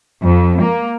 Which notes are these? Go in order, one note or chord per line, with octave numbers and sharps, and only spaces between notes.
F2
A#3